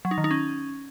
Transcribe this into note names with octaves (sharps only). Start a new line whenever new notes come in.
F#3
D#4
D#3
D#4
C#4